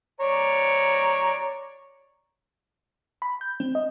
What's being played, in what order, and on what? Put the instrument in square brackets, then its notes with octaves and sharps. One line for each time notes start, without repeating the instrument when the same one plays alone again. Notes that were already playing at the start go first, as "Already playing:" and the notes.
[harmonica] C#5 D5 A#5
[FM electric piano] B5
G6
C4
D#5